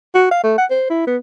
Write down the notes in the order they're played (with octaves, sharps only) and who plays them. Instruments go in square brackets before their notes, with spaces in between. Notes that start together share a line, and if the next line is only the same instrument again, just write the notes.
[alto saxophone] F#4
F5
A3
F#5
C5
E4
B3